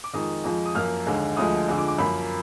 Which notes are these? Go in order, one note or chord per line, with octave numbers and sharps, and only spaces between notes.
D6
F2 D#3 G#3 D#6
F2 F3 G#3
D#6
F#2 F3 A#3 F6
D#2 D3 G#3
D2 D3 F3 G#3 D#6
F2 D3 G#3
D6
D6
F#2 F3 A#3 B5